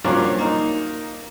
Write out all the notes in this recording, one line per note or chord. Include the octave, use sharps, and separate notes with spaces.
G2 F3 F#3 A#3 C#4 D4
A#3 D#4